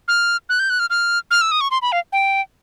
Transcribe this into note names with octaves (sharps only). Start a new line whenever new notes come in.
F6
F#6
G6
F#6
F6
F6
F6
E6
D#6
C#6
C6
B5
F5
G5